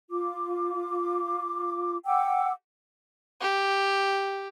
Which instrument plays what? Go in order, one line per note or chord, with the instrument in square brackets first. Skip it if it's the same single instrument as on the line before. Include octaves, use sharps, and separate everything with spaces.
[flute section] F4 D6
F#5 G5 D6 E6
[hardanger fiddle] G4